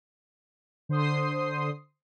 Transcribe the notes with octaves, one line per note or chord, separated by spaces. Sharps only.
D3 C5 C6 D#6 C7